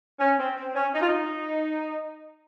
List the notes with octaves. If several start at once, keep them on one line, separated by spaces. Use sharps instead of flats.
C#4
C4
C4
C#4
D#4
F4
D#4